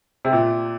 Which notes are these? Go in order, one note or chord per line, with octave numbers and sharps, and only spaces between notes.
C3
A#2